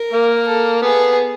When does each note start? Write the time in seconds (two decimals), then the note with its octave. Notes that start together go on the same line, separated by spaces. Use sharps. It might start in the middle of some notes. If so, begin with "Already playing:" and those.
Already playing: A#4
0.13 A#3
0.48 A4
0.83 B3 G#4